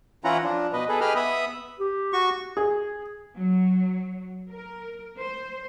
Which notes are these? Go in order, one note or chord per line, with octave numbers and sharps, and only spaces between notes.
E3 C#4 E4 F4 F#5 A#5
F3 D4
B2 B4 D#5
G#4 A4 B4
G4 G#4 B4 D#5 B5 F6
B3 E5 B5 D#6
G4
F#4 C#6
G#4
F#3
A#4
C5